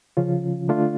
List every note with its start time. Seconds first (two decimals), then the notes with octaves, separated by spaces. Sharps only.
0.17 C#3 F3 C#4 F4
0.68 D3 A3 D4 F4